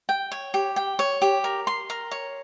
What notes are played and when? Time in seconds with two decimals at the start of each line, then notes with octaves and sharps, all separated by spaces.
0.09 G5
0.32 C#5
0.54 G4
0.76 G5
0.99 C#5
1.22 G4
1.44 A#4
1.67 C6
1.90 A#4
2.11 C#5